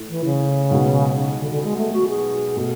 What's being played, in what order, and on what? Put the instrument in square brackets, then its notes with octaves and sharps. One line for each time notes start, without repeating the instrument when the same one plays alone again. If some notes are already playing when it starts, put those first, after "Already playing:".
Already playing: [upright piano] A2
[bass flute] E3
C#3
[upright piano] B1 B2 G#3 B3
[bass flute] C#3
D3
D3
G#3
A3
F#4
G#4
[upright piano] B2 A3